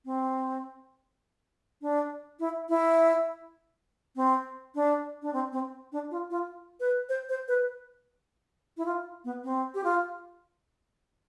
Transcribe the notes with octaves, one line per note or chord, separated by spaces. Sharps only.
C4
D4
E4
E4
C4
D4
D4
C4
C4
D4
F4
F4
B4
C5
C5
B4
E4
F4
B3
C4
G4
F4